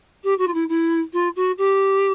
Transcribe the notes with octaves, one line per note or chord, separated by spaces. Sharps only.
G4
F#4
F4
E4
E4
F4
F#4
G4